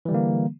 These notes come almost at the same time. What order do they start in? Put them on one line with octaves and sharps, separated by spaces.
E3 G3 D3 A#3